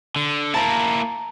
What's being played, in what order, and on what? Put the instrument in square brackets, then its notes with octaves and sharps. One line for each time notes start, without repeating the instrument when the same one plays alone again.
[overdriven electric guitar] D3
[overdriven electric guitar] A#3 E4 [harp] A5 A#5